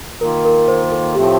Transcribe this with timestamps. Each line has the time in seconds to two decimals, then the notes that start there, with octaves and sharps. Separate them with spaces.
0.21 D#3 A#3 F4 A#4
0.45 A#4
0.68 C5
0.92 A4
1.15 A2 F3 A3 C4 G4